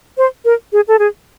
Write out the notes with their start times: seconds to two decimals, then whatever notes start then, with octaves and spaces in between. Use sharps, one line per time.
0.18 C5
0.45 A#4
0.73 G#4
0.88 A4
0.99 G#4